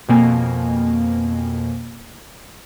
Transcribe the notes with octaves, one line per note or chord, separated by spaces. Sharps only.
F2 B2 A#3 G#5